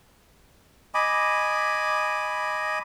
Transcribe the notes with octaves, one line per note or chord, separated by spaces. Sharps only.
D#5 G#5 B5 D6